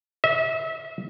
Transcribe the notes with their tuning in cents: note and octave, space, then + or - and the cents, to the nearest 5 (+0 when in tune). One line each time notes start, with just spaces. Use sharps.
E5 -30